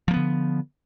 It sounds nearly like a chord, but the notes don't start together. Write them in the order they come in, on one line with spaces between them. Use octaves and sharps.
F3 A#3 B3 D3